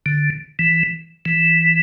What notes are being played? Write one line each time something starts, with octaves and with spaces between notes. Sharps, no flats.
D3
E3
E3